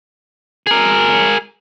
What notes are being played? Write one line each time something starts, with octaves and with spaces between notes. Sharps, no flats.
G#4 A#4